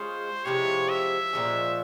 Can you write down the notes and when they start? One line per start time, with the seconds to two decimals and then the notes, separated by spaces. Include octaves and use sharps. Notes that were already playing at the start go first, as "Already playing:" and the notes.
Already playing: G#3 C#4 F4 G#4 C5
0.45 C3 F3 G#3 E4 C#5
0.89 E5
1.33 A#2 F3 G#3 C#4